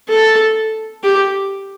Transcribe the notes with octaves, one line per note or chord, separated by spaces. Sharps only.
A4
G4